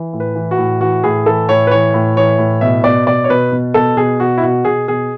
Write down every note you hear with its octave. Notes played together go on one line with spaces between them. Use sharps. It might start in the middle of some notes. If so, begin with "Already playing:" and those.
Already playing: E3
A2
B4
E3
F#4
A2
E3 F#4
A2 G#4
E3 A4
A2 C#5
B4
E3 C#5
A2
E3 C#5
A2
B2 E5
B2 D5
B2 D5
C#5
B2 B4
B2
B2 A4
B2 G#4
B2 F#4
E4
B2 F#4
B2 G#4
B2 G#4